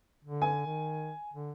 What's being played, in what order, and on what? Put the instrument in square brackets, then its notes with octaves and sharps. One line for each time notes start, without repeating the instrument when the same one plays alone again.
[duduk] D3
[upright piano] G#5
[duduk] D#3
D3